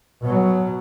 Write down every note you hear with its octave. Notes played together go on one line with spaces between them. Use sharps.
B2 F#3